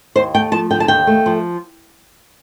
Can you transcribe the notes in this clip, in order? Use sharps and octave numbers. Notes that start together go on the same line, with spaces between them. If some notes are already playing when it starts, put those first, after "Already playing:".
D#2 C5
A3 G5
F3 A5
D3 G5
A5
D#2 G5
A3
F3